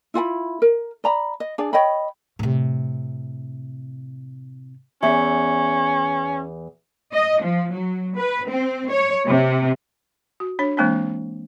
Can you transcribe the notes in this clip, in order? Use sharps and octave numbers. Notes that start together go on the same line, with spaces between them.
E4 F4 F#5 B5
A#4
D5 A#5 B5
D#5
D4 G#4 D5
C#5 D#5 G5 B5
A2 C3
E2 C#4 E5
D#5
F3
F#3
B4
C4
C#5
C3
F#4
D4 C#5
E3 G#3 A#3 C4 D4